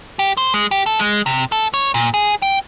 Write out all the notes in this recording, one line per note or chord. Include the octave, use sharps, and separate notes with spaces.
G4
C5
G#3
G4
A4
G#3
C3
A4
C#5
A#2
G#4
G5